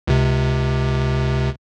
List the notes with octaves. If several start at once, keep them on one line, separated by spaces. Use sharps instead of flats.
C#2 C3